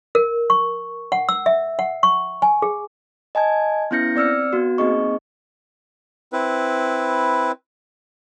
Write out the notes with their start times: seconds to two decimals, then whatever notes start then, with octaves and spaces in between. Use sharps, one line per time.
0.15 A#4
0.50 C#6
1.12 F#5
1.29 E6
1.46 E5
1.79 F#5
2.03 C#6
2.42 G#5
2.62 G#4
3.35 D#5 G#5 A5 G#6
3.91 B3 C#4 E4 G6 A#6 C#7
4.16 C4 D5 E6 F6 C#7
4.53 B3 F#4
4.78 A#3 C4 D#4 G#4 D#5 C#6
6.33 C4 E4 B4